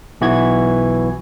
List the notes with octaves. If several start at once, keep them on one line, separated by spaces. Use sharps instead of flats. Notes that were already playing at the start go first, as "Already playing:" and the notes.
B1 E3 B3 F#4 G#6